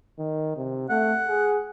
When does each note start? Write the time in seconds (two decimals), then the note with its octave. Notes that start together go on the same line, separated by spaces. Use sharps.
0.19 D#3
0.57 C3
0.90 A3 F#5
1.28 G#4